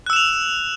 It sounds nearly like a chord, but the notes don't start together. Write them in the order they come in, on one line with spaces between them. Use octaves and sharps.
F#6 E6 E7 F7